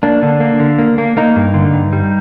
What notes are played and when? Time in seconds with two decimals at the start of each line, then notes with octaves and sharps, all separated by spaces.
0.03 A#3 D4
0.23 D3
0.40 A#3
0.60 D3
0.79 A#3
0.98 A#3
1.17 A#3 D#4
1.36 G2
1.54 D3
1.74 G2
1.93 G3